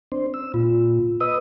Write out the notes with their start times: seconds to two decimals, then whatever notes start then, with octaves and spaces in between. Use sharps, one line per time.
0.12 C4 D4 C5
0.34 E6
0.54 A#2 F4
1.20 B4 D#5 D#6 E6